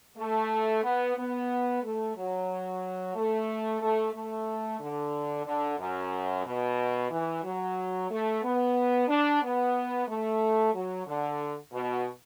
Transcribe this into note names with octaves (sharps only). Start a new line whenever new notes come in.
A3
B3
B3
A3
F#3
A3
A3
A3
D3
D3
F#2
B2
E3
F#3
A3
B3
D4
B3
A3
F#3
D3
B2